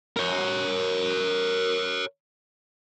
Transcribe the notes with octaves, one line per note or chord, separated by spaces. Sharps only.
A#4 C#5